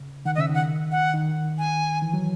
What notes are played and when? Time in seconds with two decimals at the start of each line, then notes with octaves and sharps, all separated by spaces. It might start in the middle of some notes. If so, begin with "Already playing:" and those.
Already playing: C#3
0.25 D#3 F#5
0.35 D#5
0.38 C#3 E5
0.49 D#3 F#5
0.92 F#5
1.14 D#3
1.58 G#5
2.02 E3
2.13 F#3